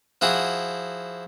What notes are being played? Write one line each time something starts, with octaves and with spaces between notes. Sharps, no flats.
F3 E4 F#4 G#4